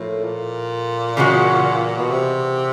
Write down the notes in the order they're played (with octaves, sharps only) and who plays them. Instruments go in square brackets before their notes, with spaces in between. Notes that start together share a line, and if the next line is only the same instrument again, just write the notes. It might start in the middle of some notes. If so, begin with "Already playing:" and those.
Already playing: [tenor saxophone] A2 [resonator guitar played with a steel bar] F3 A#3 A4
[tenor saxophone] A#2
[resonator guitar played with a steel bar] C#3 E3 G#3 C#4 F#4
[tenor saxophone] B2
C3